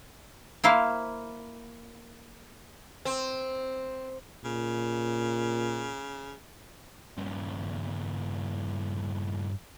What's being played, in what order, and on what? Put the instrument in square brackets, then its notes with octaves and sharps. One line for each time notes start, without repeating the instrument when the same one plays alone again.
[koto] A#3 E4 C5 F5
[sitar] C4
[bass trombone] A#2 [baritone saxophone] C#3
[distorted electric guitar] G2 C#3